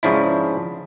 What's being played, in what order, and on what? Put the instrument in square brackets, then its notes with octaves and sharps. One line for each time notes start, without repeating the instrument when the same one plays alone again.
[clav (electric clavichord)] G#2 C#3 F3 D4 E4